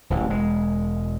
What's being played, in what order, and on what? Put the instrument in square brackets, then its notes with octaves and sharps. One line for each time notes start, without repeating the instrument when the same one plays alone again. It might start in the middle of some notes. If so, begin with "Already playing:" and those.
[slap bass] D1 A1
E1 G#3